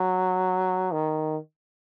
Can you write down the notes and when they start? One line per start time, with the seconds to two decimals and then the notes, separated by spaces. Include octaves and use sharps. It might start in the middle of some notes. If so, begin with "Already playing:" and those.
Already playing: F#3
0.92 D#3